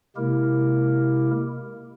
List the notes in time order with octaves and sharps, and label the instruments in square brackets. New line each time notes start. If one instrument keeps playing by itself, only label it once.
[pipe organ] C3 G#3 A#3 E4 G4 A#4